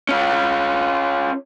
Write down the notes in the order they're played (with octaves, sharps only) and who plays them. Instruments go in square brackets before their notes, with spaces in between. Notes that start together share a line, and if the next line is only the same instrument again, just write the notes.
[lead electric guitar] C#4 F4